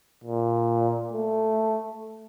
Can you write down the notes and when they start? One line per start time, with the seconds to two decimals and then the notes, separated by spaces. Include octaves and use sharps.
0.24 A#2
1.13 A3